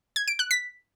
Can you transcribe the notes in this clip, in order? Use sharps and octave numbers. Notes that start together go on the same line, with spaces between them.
G#6
D7
F#6
B6